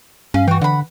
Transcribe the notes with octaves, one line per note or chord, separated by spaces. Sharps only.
G2 C#4 F5
E3 F#4 G5
D3 F#5 B5